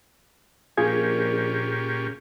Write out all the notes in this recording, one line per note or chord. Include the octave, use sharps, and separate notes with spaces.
A#1 A#2 C#4 F4 G4 G#4 G#6